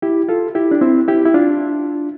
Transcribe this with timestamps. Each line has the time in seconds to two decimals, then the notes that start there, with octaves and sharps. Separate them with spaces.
0.02 E4 G4
0.29 F4 A4
0.55 E4 G4
0.71 D4
0.81 C4 E4
1.08 E4 G4
1.25 E4
1.34 D4 F4